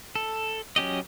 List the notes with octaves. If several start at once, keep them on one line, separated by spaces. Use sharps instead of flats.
A4
F#3 C#4 G4 D#5